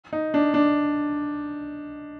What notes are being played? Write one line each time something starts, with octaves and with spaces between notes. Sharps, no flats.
D#4
D4
D4